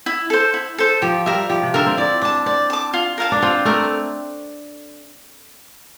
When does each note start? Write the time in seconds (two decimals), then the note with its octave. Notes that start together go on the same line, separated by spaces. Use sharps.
0.06 E4
0.30 A4 C5
0.54 E4
0.78 A4 C5
1.02 F3 G4
1.26 G3 A#4 E5
1.50 F3 G4
1.63 C3
1.74 D3 A#4 E5
1.87 C4
1.97 E4 D5
2.22 D4 A5 D6
2.46 C4 D5
2.70 A5 D6
2.93 F4
3.18 A#4 F5 A5
3.32 D4
3.42 C4 F4
3.65 A3 A#4